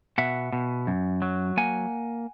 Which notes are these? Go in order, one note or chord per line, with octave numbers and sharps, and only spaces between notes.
B2 E5 F#5
B2
F#2
F#3
A#3 F#5 G#5